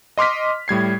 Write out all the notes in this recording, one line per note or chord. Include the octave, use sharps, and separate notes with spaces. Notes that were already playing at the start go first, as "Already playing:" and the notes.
D#5 C6 D6 F6 B6
A2 G3 G#6 C7